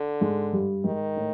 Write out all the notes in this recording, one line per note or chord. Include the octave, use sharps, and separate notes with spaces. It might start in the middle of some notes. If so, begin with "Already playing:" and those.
Already playing: D3
G#2 G#3
G2 G3
G#2 D#3 G#3
A2 A3